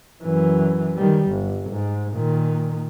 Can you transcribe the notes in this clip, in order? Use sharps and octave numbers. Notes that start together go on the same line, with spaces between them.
F#2 E3
D#3 G3
G1
G#2
A#2 D#3